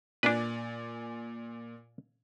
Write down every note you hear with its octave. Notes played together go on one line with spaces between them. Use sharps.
A#2 D4 B4 D5 G#5